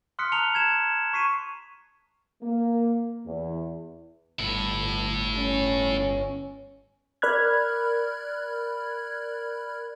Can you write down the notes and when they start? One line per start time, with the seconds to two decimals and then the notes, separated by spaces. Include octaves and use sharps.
0.19 C6 D#6 F6 F#6 B6 C#7
0.32 A5 A#5 C#7 F7 G7
0.55 G#6 E7
1.13 C#6 B6 C7 D#7
2.43 A#3
3.26 E2
4.39 G1 A2 E4
5.38 C#4
7.22 A#4 D5 B5 F6 F#6 G#6